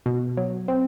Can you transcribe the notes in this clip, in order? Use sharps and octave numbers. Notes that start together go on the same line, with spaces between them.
B2
F#3
C4